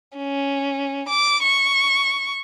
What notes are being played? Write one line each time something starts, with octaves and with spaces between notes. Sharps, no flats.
C#4
D6
C#6